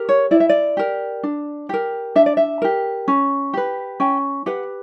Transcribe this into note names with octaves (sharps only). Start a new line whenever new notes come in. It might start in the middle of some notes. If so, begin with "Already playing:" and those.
Already playing: G4 A#4
C#5
E4 D5
E5
D5
G4 A#4
D4
G4 A#4
D4 E5
D5
E5
G4 A#4
C#4
G4 B4
C#4 G5
G4 B4 F#5